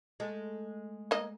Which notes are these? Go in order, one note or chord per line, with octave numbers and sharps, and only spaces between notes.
G#3 A3
A#3 D#5